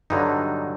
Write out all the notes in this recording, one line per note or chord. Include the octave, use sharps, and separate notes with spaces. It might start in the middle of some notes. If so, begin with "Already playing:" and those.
G2 D3 F#3 D#4